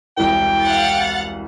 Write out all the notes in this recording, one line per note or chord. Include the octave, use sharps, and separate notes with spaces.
E1 C2 E3 G5
F5 F#5 A6